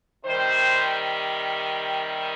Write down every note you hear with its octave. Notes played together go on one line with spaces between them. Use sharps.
C3 D#3 G3 C5